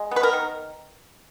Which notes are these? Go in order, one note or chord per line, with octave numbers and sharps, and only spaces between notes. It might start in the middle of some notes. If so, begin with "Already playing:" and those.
Already playing: G#3
B3 B4
A#4
D#3